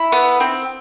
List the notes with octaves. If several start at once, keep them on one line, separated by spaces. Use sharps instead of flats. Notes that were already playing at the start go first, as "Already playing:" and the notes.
Already playing: E4
B3
C4